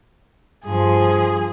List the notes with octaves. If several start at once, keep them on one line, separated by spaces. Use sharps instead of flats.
G2 F3 G#4